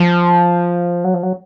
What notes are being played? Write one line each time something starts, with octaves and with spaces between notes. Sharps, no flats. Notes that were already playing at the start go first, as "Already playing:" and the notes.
Already playing: F3
F#3
F3
F#3